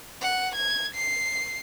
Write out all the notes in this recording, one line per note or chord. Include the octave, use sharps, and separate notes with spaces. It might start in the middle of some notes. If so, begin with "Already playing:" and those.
F#5
G#6
C7